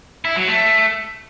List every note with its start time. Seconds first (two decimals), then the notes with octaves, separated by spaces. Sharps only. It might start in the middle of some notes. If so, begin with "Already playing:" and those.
0.25 E4
0.36 F#3
0.48 A3